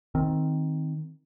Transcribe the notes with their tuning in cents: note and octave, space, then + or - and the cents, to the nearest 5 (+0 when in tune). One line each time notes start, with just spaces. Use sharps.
D#3 +10 C4 +0